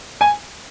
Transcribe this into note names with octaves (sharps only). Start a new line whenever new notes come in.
G#5